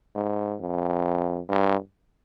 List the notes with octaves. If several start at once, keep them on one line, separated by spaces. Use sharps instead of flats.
G#2
F2
G2